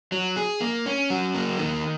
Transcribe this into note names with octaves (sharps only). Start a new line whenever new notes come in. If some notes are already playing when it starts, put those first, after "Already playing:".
F#3
G#4
A#3
C#4
F#3
A#3
D#3